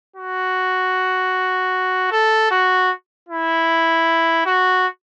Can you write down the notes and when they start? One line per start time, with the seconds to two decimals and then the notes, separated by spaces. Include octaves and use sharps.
0.16 F#4
2.11 A4
2.51 F#4
3.29 E4
4.46 F#4